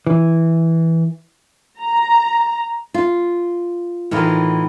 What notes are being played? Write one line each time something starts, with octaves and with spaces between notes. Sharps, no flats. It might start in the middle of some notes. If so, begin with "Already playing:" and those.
E3
A#5
F4
A2 D#3 E3 F4